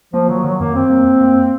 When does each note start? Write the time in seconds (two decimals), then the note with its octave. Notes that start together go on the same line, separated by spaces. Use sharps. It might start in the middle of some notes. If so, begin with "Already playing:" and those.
0.13 F3 A#3
0.29 D#3 F#3
0.44 D#3 F#3
0.60 F#2 A#3
0.75 F#2 C4
0.90 A#3
1.05 F#2
1.21 A#3